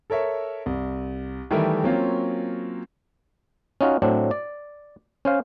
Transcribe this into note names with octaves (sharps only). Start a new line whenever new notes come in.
A4 A#4 C#5 E5
C2
D#3 E3 G3 A3 E4 A#4
F#3 A#3 C4 C#4 F4
C#4 D#4 F4 F#4
A2 F#3 C4 D4
D5
C#4 C5 F5